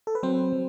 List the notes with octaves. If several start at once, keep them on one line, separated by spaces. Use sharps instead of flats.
A4
B4
F#3 C4 C5
F#3